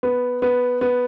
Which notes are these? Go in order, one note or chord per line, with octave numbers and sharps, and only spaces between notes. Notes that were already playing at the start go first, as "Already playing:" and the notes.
B3
B3
B3